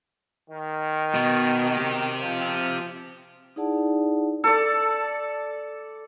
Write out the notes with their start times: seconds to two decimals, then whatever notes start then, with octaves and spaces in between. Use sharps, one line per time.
0.50 D#3
1.15 B2
1.77 C4 G4
2.22 F3
3.56 D#4 E4 G#4 D5 F#5 A5
4.44 A4 D5